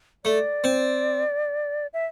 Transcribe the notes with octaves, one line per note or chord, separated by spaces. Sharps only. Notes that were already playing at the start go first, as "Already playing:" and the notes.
A3 D5
C4
E5